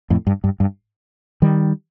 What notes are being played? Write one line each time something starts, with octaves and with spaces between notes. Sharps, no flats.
F2 A2
G2
G2
G2
D#3 G3